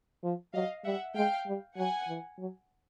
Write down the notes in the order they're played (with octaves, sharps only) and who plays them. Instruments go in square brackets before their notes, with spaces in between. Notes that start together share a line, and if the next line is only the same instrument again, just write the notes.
[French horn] F3
[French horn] F#3 [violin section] D#5 F5
[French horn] G3 [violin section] E5 F#5
[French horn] G#3 [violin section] F5 G5
[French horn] G3
[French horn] F#3 [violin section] F#5 G#5
[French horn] E3
F#3